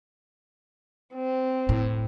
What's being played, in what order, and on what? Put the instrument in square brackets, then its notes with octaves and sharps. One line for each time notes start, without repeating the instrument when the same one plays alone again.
[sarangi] C4
[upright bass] A2